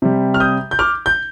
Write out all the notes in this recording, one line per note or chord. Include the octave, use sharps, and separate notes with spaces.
C3 G3
F6
D#6 G6
G6
D6 F6
G6